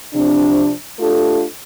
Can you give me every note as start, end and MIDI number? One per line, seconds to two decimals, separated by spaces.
0.14 0.71 48
0.14 0.71 53
0.14 0.71 60
0.14 0.71 62
0.99 1.43 57
0.99 1.43 62
0.99 1.43 65
0.99 1.43 67
0.99 1.43 69